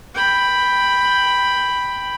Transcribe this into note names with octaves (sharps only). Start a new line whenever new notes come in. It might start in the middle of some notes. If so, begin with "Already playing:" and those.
G5 B5